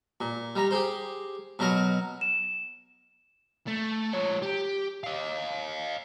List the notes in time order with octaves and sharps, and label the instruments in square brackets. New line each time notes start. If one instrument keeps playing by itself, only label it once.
[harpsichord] A#2
G3 A#5
G4 G#4 C5
B2 F#3 A#4 D#5
[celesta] E7
[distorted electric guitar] A3
F3 C#5
G4
D#5 F5